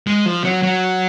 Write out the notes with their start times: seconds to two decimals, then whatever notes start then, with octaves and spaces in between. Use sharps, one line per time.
0.07 G#3
0.26 F3
0.44 F#3
0.63 F#3